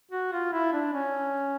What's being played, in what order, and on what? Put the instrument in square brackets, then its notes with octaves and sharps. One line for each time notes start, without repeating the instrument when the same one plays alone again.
[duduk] F#4
F4
E4
D4
C#4